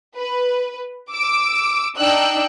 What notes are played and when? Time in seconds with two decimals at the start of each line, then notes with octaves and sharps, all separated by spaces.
0.16 B4
1.10 D6 E6 D7
1.96 D4 D#4 D5 G5 E6 F#6